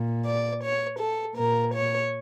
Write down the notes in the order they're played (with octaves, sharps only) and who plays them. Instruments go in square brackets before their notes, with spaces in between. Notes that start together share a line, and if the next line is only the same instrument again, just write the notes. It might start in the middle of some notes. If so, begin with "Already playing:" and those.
Already playing: [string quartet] A#2
D5
C#5
A4
A#2 A#4
C#5